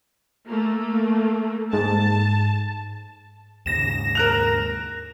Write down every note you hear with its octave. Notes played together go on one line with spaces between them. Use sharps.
A3 A#3
G#2 A5
D#2 G#2 C#3 A#6 E7
A#4 F#6 F7